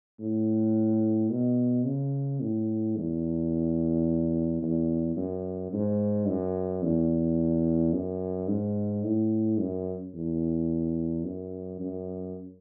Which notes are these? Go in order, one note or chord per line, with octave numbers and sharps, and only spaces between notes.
A2
B2
C#3
A2
E2
E2
F#2
G#2
F#2
E2
F#2
G#2
A2
F#2
E2
F#2
F#2